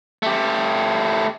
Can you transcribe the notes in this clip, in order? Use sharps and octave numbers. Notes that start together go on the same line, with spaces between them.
A3 G4